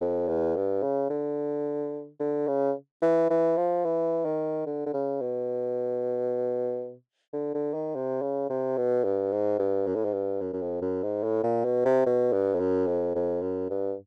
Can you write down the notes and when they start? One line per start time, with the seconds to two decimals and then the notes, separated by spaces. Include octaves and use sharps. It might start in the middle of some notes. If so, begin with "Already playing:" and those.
0.01 F2
0.28 E2
0.56 G2
0.83 C#3
1.10 D3
2.20 D3
2.47 C#3
3.02 E3
3.30 E3
3.57 F3
3.85 E3
4.25 D#3
4.66 D3
4.86 D3
4.93 C#3
5.21 B2
7.33 D3
7.54 D3
7.74 D#3
7.95 C3
8.22 C#3
8.50 C3
8.77 B2
9.04 G2
9.32 G#2
9.59 G2
9.87 F#2
9.95 A2
10.05 G#2
10.13 G2
10.41 F#2
10.53 F#2
10.62 F2
10.82 F#2
11.03 G#2
11.23 A2
11.43 A#2
11.65 B2
11.85 C3
12.06 B2
12.33 G2
12.54 F2
12.60 F#2
12.87 F2
13.15 F2
13.42 F#2
13.70 G2